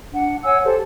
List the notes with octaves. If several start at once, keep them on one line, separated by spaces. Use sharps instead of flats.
D4 F#5
C#5 F#5 G#5 E6
G4 A4 C5